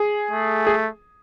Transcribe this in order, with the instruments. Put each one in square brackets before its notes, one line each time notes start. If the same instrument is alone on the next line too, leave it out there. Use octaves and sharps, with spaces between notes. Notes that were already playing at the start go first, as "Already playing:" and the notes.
Already playing: [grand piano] G#4
[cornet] A3
[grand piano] G#4